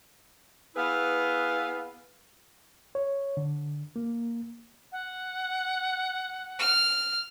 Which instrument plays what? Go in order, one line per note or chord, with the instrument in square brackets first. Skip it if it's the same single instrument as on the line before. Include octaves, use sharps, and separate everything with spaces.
[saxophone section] B3 E4 G#4 B4 F5
[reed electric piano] C#5
D3
A#3
[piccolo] F#5
[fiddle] F6